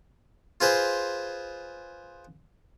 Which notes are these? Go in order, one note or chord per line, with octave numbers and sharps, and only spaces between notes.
F4 G#4 B4 C5